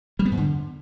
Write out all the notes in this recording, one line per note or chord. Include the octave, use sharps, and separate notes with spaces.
G3
B3
G#2
D3